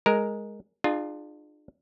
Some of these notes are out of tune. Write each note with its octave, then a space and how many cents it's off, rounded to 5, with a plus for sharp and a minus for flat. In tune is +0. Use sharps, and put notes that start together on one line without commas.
G#3 +0 A#4 +0
D4 +40 F4 +0 G#4 +0